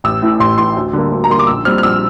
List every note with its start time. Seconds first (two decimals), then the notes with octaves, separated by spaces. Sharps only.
0.04 A1 E6
0.22 A2 E3
0.40 A1 C6
0.58 A2 E3 C6
0.76 D2
0.93 D3 G3 A#3
1.11 D2
1.24 A#5
1.29 D3 G3 A#3 C6
1.39 D6
1.47 A#1 E6
1.65 A#2 G3 C4 F6
1.78 F6
1.83 A#1 E6